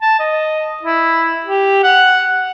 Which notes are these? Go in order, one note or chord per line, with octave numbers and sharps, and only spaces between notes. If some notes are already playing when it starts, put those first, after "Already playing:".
A5
D#5
E4
G4
F#5